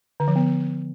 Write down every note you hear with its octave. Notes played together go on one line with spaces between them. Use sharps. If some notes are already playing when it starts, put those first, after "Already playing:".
D3
F3
B3